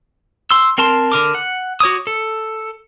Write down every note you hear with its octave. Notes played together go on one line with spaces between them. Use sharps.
C6 E6
C4 A#4 A5 C6
D3 A#4 D6
F#5
F#4 C#5 D6 D#6
A4